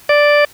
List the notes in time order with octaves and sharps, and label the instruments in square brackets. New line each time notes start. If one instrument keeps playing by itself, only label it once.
[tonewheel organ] D5